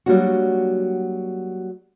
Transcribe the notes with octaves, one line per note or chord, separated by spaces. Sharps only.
F#3 G3 A#3 D4 F#4